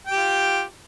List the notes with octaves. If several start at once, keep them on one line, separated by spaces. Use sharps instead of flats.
F4 G4 G5